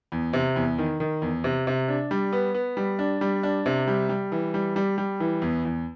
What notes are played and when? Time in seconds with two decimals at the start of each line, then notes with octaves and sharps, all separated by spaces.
0.12 E2
0.33 C3
0.56 E2
0.78 D#3
1.00 D#3
1.22 E2
1.44 C3
1.67 C3
1.88 D4
2.11 G3
2.33 B3
2.54 B3
2.77 G3
2.99 D4
3.21 G3
3.43 D4
3.66 C3
3.87 G3
4.09 G3
4.32 E3
4.54 G3
4.76 G3
4.98 G3
5.20 E3
5.42 E2
5.65 E2